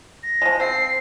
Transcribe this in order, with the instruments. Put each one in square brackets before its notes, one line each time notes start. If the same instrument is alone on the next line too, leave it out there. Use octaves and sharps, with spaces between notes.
[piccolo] A#6
[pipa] F3 G#3
[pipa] C4 [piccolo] C7